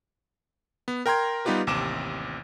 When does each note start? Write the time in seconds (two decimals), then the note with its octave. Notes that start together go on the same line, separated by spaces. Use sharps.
0.88 B3
1.06 A#4 G5 A#5 C6 G#6
1.45 G3 B3 D#4 F4 G4 B4
1.67 A1 D#2 C3 D6 E7